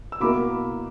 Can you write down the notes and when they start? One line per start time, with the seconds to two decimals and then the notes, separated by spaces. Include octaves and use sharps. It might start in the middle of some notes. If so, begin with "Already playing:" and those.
0.12 E6
0.20 B2 A#3 E4 A#4 B5 D6